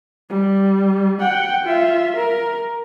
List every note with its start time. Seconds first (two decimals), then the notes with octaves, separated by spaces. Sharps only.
0.30 G3
1.20 F#5 G5
1.64 F4 E5
2.17 A#4